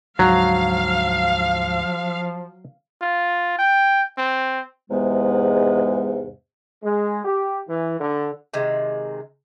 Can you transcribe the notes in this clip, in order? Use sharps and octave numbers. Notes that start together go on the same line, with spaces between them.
D2 G#2 F3 F#3 F5
F4
G5
C4
E2 G#2 C3 G#3 B3
G#3
G4
E3
D3
C3 D#3 G#3